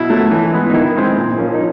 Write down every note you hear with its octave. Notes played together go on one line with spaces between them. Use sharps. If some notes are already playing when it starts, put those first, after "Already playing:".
Already playing: B2 E4
F#3 A3
E3
G#3 B3
D#4
D#3 E4
G#3 C4
A#2
F3 A#3 C#4
D#4